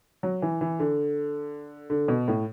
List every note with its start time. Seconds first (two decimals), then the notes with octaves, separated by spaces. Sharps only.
0.23 F#3
0.42 E3
0.61 E3
0.79 D3
1.90 D3
2.08 B2
2.28 A2